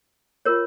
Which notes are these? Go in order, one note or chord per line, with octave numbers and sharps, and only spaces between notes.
F4 A#4 C#5